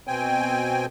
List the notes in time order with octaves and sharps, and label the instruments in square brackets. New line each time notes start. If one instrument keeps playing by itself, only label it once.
[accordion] B2 C4 G5 G#5